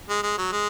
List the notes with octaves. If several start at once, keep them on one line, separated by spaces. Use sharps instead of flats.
G#3
G#3
F#3
G#3